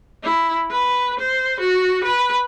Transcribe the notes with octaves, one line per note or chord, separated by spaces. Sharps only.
E4
B4
C5
F#4
B4